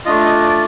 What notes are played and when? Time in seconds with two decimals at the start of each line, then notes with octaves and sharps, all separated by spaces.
0.05 A3 D4 F4 D#5
0.25 D#5
0.44 D5